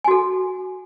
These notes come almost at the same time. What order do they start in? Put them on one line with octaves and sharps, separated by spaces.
G#5 F#4 A4